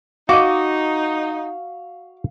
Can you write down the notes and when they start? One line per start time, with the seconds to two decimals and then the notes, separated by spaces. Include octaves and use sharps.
0.29 D#4 F#4 D#5 F5 D6